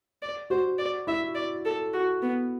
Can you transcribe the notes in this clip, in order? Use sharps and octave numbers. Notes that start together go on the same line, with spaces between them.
D5
F#4 C5
D5
E4 E5
D5
A4
F#4
B3